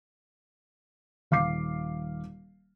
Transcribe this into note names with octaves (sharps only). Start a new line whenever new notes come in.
D#1 F5 D6 C7